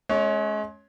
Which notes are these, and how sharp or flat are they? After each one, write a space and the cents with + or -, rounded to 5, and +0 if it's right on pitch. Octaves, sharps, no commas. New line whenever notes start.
G#3 +35 C#4 -5 C#5 +0